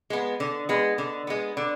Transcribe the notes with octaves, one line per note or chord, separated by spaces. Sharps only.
G#3 B3
D3
G#3 B3
D3
G#3 B3
D3